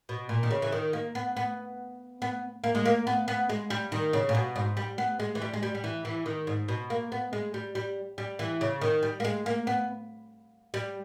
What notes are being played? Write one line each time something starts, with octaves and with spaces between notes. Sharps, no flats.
B2
A#2
D#3
C#3
E3
D#3
A#3
B3
B3
B3
A#3
G#3
A#3
B3
B3
G#3
G3
D#3
C#3
A#2
B2
G#2
G3
B3
G#3
E3
G3
G#3
G3
G3
E3
E3
D#3
G#2
B2
A#3
B3
G#3
G3
G3
G3
E3
C#3
D#3
G3
A#3
G#3
A#3
B3
G3